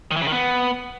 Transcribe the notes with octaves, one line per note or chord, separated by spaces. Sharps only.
D#3
E3
C#3
D#3
B3